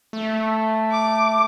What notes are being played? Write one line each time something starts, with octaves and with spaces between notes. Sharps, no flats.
A3
D6